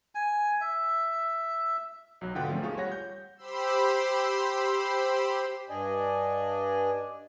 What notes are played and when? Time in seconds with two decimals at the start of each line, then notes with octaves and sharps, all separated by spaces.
0.15 G#5
0.61 E5
2.21 B1 F#3
2.35 G#1 B2 D3 F4 F#5 G5
2.49 D#3 F3 A3 C4 C#4
2.63 D#2 F4 G#4 C#6
2.77 G3 C#5 F#5 A#6
2.92 G6
3.37 G4 C5 B5 C6 E6
5.69 G2 D4 D5 D#5 G#5